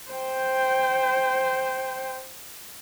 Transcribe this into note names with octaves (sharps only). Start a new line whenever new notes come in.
C5 G5